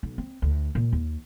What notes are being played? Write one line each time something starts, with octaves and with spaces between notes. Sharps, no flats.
B1
C4
D2
A#2
D#2